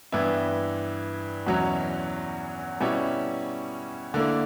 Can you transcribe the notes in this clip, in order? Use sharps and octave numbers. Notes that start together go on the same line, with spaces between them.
G2 E3 B3 E4
E2 B2 F#3 C#4 E4
B2 G3 C#4 E4
D3 A#3 E4